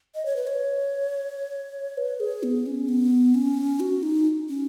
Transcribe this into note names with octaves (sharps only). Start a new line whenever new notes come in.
D#5
C#5
B4
C#5
B4
G#4
B3
C#4
B3
C#4
F#4
D#4
C#4